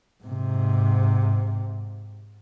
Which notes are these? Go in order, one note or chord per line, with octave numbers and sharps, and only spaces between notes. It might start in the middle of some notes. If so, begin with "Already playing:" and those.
G#2 C3